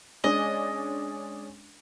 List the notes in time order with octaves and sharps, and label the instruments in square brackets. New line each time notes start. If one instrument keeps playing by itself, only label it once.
[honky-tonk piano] G#3 C#4 D4 [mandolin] D#5